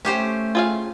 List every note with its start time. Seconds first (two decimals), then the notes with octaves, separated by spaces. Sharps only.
0.05 A3 C#4 G4 C5
0.55 F4 G#4 F5